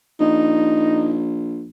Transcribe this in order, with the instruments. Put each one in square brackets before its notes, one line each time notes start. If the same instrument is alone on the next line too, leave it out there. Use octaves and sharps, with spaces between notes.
[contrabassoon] A#1 [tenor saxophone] D#4